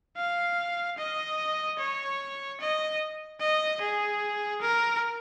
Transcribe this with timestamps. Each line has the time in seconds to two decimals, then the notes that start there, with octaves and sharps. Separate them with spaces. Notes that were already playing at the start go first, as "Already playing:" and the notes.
0.17 F5
0.98 D#5
1.79 C#5
2.61 D#5
3.40 D#5
3.81 G#4
4.62 A#4